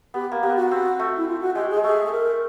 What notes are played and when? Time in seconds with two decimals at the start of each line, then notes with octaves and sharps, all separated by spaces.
0.14 B3 G4
0.32 A#3
0.43 B3 G4
0.57 F#4
0.71 C4
0.99 A3
1.17 E4
1.27 F4
1.41 F#4
1.55 G#3 G4
1.69 G#4
1.76 G#3
1.84 A3 G#4
2.06 A4
2.12 A#4